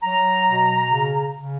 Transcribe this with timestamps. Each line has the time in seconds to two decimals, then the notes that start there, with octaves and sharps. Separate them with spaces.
0.02 F#3 A#5
0.45 B2
0.89 C#3
1.33 C#3